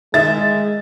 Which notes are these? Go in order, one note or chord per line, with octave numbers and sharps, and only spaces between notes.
D#3 G#3 E5 A6